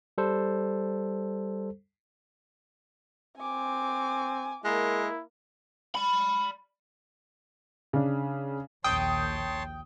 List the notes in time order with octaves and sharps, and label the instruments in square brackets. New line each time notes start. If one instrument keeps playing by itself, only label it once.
[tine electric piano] G3 A4 C5
[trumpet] C4 [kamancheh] G#5 D6
[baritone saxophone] G#3 [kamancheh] A#3 A#4 [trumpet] E4
[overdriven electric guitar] D5 B5
[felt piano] C#3 D4
[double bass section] A#1 D#2 [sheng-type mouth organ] C#5 A5 C6 [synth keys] G5 [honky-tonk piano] D#6